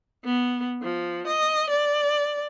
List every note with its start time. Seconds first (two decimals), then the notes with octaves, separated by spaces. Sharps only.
0.25 B3
0.82 F3
1.27 D#5
1.70 D5